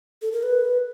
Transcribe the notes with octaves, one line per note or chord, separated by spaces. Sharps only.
A4
A#4
B4